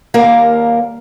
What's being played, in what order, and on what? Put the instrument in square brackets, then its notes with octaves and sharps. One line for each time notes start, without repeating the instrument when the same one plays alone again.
[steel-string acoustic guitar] D#2 G3 A#3 A#4 F5